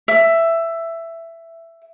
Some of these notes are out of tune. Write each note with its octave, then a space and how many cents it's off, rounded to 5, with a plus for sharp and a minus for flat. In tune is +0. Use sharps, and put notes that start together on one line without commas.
E5 +10